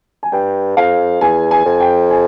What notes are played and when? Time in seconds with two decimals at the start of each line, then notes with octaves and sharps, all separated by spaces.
0.23 G#5
0.32 G2 G5
0.76 F2 F5
1.21 E2 G#5
1.51 G#5
1.65 F2
1.80 G5
2.10 G#5